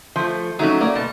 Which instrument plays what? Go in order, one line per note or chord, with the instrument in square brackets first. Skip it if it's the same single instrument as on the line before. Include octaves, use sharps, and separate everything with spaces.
[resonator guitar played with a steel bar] F3 A3
[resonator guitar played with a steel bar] F#3 A3 C#4 [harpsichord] D#4
[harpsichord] A#3 [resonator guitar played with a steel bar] D5
[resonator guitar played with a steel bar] B2 [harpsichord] A5